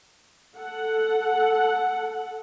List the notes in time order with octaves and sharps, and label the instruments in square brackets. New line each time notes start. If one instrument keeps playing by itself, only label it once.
[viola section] A4 F#5